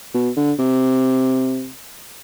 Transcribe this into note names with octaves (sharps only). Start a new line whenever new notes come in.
B2
D3
C3